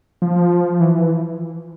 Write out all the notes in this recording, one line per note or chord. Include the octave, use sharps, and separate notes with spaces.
F3
E3